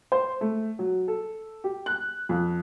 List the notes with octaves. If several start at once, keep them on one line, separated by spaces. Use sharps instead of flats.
C5
A3
F#3
A4
G4
F#6
F2